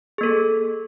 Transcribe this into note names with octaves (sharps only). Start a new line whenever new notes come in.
A#3 G#4 A4